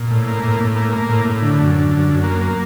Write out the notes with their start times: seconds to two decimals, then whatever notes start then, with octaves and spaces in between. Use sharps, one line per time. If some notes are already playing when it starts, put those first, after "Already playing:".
Already playing: A#2
0.11 A2
0.27 A#3
0.44 A2
0.60 A2
0.76 A#3
0.93 A#3
1.09 A2
1.25 A2
1.42 D3
1.58 F#2
1.75 D3
1.91 F#2
2.08 F#2
2.24 A#3
2.41 A#3